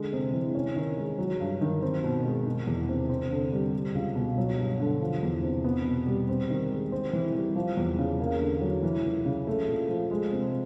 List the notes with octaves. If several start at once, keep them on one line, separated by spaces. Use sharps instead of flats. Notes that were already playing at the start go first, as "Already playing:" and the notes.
Already playing: D3 G#3
C3
E3
C#4
D#3
G#3
F#3
G2
D#3
C4
B2
G#3
D#3
E2
C3
C4
D3
G3
G3
C#2
B2
F#3
G2
D3
F3
E2
C3
B3
B2
G3
C4
D#3
G#3
C4
E3
G3
F3
E2
C#3
A#3
D3
F#3
E3
C#2
C#3
A3
A#2
F3
G#3
C3